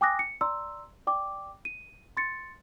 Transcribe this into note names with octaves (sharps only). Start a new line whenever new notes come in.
G5 G#5 D6 D#6 F#6 A#6
C#7
D5 A#5 C6 E6
D5 G5 D6
D#7
C6 A6 C#7